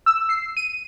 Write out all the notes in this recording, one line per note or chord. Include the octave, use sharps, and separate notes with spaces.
E6
C7
D#7